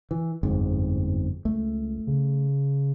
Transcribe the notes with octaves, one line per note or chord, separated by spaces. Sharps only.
E3
G1 F2 G#2
C#2 A3
C#3